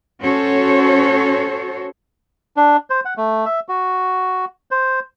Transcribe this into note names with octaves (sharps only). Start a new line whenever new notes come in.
C#4 F#4 A4 C5 C#5
D4
C5
F#5
A3
E5
F#4
C5